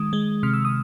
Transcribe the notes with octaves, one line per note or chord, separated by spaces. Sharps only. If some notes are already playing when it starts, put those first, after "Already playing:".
Already playing: D#3 G#3 D#6
G#3
C3 F6
E6
D#6